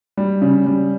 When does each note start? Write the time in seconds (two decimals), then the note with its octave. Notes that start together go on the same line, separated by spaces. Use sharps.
0.17 G3
0.42 C#3
0.66 G3